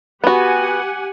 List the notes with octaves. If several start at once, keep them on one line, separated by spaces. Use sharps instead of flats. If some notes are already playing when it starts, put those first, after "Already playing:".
B3 F#4 G4 F#5 G#5